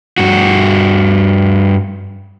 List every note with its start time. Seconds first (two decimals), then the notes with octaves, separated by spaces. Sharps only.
0.18 G2 F#4